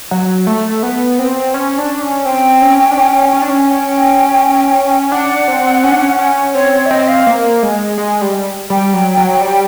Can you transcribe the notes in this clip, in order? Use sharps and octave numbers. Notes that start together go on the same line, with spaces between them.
F#3
A3
B3
C4
C#4
D4
C#4
C4 G5
C#4
D4
C#4
C#4
D4
C#4
G5
D4 F#5
C4
C#4
D4
C#4
C#4
C4 C#5
C#5
E5
C4 D#5
F5
A#3
G#3
G#3
G3
G3 G5
F#3
F#3
G3